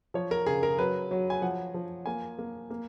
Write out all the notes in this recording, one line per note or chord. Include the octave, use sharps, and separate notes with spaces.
F3 C#5
A#4
C#3 G#4
A#4
F#3 B4
F#3
G#5
F3 F#5
F3
A#3 G#5
A#3
A#3